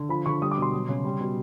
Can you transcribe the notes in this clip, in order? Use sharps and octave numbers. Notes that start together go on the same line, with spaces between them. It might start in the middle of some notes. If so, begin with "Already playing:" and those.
Already playing: D3
F3 B5
D3 C#6
G3 D#6
D6
B2 C6
F#3
C#3
G3
B2